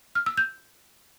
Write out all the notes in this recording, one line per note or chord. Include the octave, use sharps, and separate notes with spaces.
F6
E6
G6